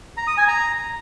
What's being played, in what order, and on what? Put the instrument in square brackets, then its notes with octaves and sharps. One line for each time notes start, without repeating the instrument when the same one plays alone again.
[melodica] A#5
D#6
G#5
A#5